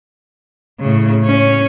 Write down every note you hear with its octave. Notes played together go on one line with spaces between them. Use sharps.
A2 C#3
C#4